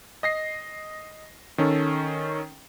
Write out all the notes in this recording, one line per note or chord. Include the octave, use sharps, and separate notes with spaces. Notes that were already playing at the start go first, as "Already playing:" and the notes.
D#5 A#6 C7
D#3 C#4 A4